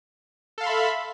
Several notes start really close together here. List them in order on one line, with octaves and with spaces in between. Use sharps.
A4 F5 C6 B5 E5